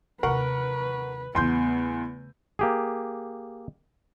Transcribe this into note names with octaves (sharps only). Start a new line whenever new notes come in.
D#2 C3 A#4 B4 F#5 C#6
E2 C#3 A3 B3 C6 G6
A#3 G4 G#4